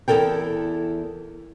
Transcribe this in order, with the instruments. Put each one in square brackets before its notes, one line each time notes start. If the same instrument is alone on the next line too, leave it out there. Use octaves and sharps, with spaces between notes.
[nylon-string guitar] E2 E4 A4 A#4 G5